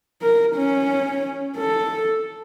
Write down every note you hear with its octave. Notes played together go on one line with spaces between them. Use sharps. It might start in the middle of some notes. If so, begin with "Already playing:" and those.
A#4
C#4
A4